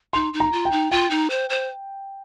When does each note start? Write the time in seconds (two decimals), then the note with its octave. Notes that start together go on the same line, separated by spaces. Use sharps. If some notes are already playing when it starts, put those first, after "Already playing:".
0.13 D#4 C6
0.34 D#4
0.40 A#5
0.52 F4
0.65 G5
0.72 D#4
0.91 F4 G5
1.11 D#4
1.30 C5
1.50 C5